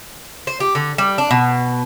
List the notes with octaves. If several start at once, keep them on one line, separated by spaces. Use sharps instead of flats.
C5
G4
D3
G3
D4
B2